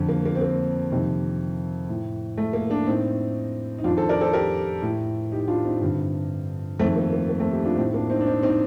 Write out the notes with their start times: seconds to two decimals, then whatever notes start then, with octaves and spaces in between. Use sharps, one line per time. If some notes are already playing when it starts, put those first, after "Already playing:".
Already playing: F2 D3
0.09 A#3
0.26 A#3
0.35 C4
0.41 A#3
0.91 F2 C3 D#3
1.89 A2
2.37 A3
2.53 A#3
2.70 A#3 D4
2.86 A2 C4 D#4
3.79 D#4
3.84 F2 D4 F4
3.89 D#3
3.97 A4 C5
4.09 A#4 D5
4.21 A4 C5
4.33 G4 A#4
4.82 A2
5.32 D#4 G4
5.48 D4 F4
5.65 C4 D#4
5.81 G2 D3
6.79 F2 A3 C4
6.82 D#3
6.96 A#3
7.13 A#3
7.29 A#3
7.40 A3 C4
7.52 D#4 G4
7.64 D4 F4
7.77 A2 C4 D#4
7.94 A#3 D4
8.10 C4 D#4
8.21 D4
8.26 C4 D#4
8.43 C4 D#4